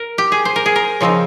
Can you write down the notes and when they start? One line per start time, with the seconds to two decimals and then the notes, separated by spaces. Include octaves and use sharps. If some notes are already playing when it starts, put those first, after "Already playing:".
Already playing: A#4
0.18 G4
0.32 G#4
0.45 C5
0.56 A#4
0.66 G#4
0.76 A#4
1.01 C#3 F3 C4 D#4